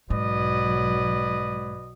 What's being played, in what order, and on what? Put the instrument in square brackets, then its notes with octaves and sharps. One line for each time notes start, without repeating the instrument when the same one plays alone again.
[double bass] B1 F#3 [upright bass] G#2 [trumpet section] B4 D5 D#5